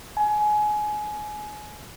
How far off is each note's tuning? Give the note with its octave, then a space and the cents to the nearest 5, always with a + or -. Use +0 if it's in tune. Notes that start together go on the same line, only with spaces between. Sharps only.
G#5 +25